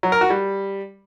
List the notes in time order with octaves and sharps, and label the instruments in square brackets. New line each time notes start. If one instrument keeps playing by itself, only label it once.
[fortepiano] F#3
A#4
F#4
G3